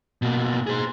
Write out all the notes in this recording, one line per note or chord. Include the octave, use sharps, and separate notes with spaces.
B2 A#3
G#4 C5